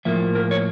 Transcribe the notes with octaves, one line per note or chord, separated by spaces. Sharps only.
A2 F3 A#3 E5
A#4
C#5